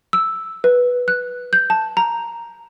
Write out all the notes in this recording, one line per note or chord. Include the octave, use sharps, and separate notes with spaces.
E6
B4
F#6
G6
A5
A#5